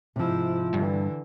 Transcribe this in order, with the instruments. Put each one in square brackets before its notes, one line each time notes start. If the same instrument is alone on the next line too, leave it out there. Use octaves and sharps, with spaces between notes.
[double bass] G#2 E4 [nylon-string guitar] C3 F3
[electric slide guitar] G2 [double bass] D3 E3